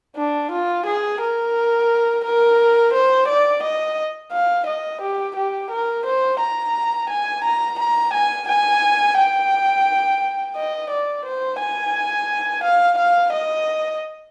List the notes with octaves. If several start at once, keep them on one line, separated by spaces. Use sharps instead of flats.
D4
F4
G#4
A#4
A#4
C5
D5
D#5
F5
D#5
G4
G4
A#4
C5
A#5
G#5
A#5
A#5
G#5
G#5
G5
D#5
D5
C5
G#5
F5
F5
D#5